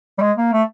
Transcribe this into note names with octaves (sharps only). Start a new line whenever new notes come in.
G3
G#3
A#3
A3